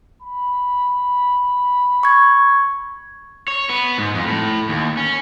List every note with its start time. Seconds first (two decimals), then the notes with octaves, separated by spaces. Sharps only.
0.22 B5
2.03 C#6 G#6
3.48 C#5
3.69 B3
3.98 G#2
4.15 F2
4.28 A2
4.69 D#2
4.97 C#4